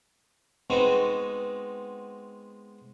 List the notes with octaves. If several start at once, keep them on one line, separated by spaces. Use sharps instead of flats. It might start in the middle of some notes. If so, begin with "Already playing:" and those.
G#3 B3 C4 D#4 F#4